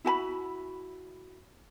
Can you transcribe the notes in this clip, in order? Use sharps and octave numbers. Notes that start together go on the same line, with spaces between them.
E4 F#4 G#5 B5